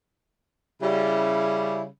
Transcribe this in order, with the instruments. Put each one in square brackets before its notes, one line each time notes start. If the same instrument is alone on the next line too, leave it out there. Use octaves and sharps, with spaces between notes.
[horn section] C#3 G3 [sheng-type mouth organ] E4